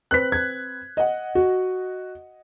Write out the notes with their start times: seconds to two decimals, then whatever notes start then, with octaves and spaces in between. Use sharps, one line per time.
0.11 C4 B4 F#6 B6
0.32 G#6
0.97 D#5 F#5
1.35 F#4